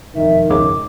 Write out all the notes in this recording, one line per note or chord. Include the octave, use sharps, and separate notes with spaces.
E1 F2 D#3 E5
G#1 C#2 D6